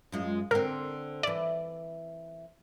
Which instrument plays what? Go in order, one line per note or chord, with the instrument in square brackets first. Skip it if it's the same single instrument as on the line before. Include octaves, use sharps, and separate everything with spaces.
[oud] F#2 G#3 F4
[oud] D3 C4 [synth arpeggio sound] A#4
[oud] E3 E5 [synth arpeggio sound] D5